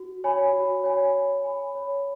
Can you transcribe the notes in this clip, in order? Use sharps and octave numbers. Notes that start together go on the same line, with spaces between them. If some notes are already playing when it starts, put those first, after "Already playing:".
Already playing: F#4
C#5 G#5 B5
F#4
C#5 G#5 B5
C#5
G#5 B5
C#5